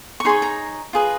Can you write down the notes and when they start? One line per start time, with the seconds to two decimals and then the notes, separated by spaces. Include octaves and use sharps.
0.20 C#6
0.25 D#4 G#4 C#5 C6
0.42 A#5
0.93 F4 G#4 B4 D#5